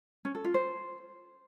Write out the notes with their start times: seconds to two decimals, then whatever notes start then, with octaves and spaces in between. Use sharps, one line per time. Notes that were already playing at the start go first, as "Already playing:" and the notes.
0.25 C#4
0.35 A4
0.44 F4
0.54 C5